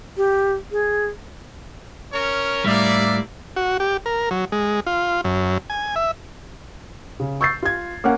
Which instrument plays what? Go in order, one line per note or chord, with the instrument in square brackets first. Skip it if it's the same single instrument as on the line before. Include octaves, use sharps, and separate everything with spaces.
[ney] G4
G#4
[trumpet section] C#4 A#4 C#5
[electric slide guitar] A2 G3 [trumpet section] A#3 D5 E5
[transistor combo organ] F#4
G4
A#4
F#3
G#3
F4
F#2
G#5
E5
[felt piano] C#3
C#6 E6 G6 A6 C7
F4 G#6
A#3 C#4 C#5 F5 F#5